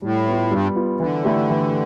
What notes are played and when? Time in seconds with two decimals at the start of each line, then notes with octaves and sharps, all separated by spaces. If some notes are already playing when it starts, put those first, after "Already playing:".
0.02 A2 G3
0.27 B3 F4
0.51 G2 G3
0.75 B3 F4
1.00 D3 E3
1.25 A3 E4 G4
1.49 E3